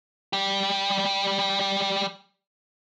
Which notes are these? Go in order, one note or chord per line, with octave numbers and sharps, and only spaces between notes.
G3 G4